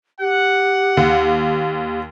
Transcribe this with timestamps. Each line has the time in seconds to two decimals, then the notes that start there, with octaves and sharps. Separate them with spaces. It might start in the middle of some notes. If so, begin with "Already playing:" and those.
0.20 G4 F#5
0.97 D#2